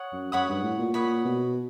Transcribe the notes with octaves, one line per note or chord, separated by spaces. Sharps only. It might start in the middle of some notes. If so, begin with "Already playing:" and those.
Already playing: C#5 F#5 D#6
F#2
F#2 C#5 F#5 B5 D#6
G2
A2
A#2
A#2 C#5 F#5 B5 D#6
B2